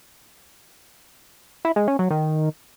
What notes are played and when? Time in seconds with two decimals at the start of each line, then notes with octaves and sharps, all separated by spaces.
1.65 E4
1.76 G#3
1.88 C#4
1.99 F#3
2.11 D#3